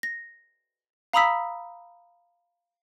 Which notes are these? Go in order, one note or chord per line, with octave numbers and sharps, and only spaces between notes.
A#6
F5 A#5 B5 D#6 E6 B6